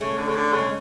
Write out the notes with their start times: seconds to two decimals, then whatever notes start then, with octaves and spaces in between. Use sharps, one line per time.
0.01 C#3 A3
0.18 D3
0.28 C#3
0.35 D3
0.53 C#3
0.59 G#3